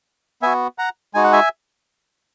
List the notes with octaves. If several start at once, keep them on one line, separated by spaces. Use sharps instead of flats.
B3 F#4 E5 G#5
F#5 A#5
G#3 D#4 F#4 G#5
F#5
E5 G#5